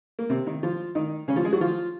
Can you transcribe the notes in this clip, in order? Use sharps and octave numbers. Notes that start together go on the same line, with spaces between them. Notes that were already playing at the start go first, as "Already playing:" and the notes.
A#3
C3 C4
D#3 D#4
F3 F4
D#3 D#4
C#3 C#4
F3 F4
G#3 G#4
F#3 F#4
F3 F4